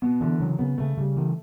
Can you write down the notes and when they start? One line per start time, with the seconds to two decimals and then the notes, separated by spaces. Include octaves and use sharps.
0.02 B2 B3
0.21 D3 E3
0.40 C#3 F#3
0.59 C#3 B3
0.78 C#3 A3
0.97 C#3 G3
1.16 E3 A3